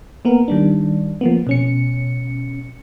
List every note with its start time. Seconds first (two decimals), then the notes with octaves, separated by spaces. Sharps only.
0.25 A#3 B3 A#4
0.48 D#3 G3 D4
1.21 F3 A#3 B3
1.47 B2 C#4 C#7